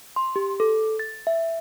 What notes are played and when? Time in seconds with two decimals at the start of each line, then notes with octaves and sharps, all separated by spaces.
0.16 C6
0.36 G4
0.60 A4
0.99 A6
1.27 E5